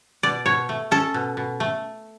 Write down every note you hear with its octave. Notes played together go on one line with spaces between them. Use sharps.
B2 D5
B2 C#5
A3
C#4 A4
B2
B2
A3